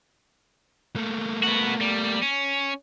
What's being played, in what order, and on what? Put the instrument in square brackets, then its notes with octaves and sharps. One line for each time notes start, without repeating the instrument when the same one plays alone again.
[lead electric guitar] A3 A#3
[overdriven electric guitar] B3 F#4
G3
C#4